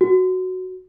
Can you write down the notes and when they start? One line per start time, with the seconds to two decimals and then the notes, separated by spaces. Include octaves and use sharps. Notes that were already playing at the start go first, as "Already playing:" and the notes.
0.01 F#4